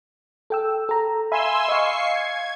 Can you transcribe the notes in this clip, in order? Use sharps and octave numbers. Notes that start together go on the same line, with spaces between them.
A4 G5 E6
A4 A#5
E5 F5 G#5 B5 C6 E6
D#5 F5 C#6 C7
G#6